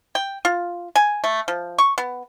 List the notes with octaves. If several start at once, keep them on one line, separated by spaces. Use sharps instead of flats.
G5
F4
G#5
A3
F3
C#6
B3